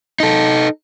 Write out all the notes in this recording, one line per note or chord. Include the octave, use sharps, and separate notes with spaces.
D#4 A4